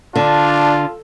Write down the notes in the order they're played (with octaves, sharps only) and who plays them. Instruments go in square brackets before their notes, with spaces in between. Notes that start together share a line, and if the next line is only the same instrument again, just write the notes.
[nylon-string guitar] D3 [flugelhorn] D4 [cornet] F4 [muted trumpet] A5